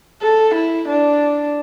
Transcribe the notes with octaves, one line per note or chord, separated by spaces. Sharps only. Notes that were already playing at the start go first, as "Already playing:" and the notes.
A4
E4
D4